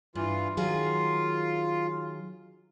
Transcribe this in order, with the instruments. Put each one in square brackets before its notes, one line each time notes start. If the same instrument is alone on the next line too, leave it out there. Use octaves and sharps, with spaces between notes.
[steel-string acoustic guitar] G2 [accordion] E3 F4
[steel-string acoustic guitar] D#3 F#3 G#4 [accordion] F4